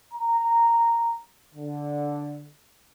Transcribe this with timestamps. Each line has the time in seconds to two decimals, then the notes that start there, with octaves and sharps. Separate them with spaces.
0.14 A#5
1.55 D3